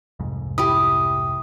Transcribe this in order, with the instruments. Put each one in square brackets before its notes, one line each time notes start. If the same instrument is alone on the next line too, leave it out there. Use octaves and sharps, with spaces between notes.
[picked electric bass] C2 F2 G#2
[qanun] E4 G4 [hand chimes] D#6